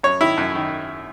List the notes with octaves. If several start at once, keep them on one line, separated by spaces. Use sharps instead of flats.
F#2 C#5
D#3 E4
F#2
D#3